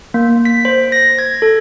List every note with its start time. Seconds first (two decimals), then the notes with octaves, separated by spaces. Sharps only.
0.14 A#3
0.45 B6
0.65 C5
0.92 A#6
1.19 G#6
1.42 A4